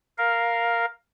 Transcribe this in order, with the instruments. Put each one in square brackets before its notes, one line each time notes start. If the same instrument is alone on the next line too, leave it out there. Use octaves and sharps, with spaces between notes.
[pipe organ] A#4 F5